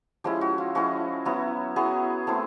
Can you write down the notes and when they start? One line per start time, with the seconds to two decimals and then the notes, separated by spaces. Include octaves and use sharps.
0.24 F3 G#3 C#4 E4 G4
0.41 F#4
0.58 F4
0.75 F3 G#3 C#4 E4 F#4
1.25 F#3 B3 E4
1.76 F#3 B3 E4 G#4
2.27 A3 C4 E4